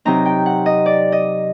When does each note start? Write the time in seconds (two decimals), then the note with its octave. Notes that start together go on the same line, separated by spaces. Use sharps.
0.05 C3 F#3 C4 D#4 A#5
0.25 G5
0.46 F#5
0.66 D#5
0.86 D5
1.12 D#5